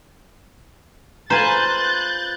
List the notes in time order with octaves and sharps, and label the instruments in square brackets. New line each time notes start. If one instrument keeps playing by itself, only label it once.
[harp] F4 B4 A#5 [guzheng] C5 G#5 [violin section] F#6 G6 A6